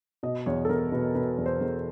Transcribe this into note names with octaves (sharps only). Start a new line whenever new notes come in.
B2 D#5
E2 C#5
A4
E2 A#4
B2 B4
B2 B4
E2
C5
E2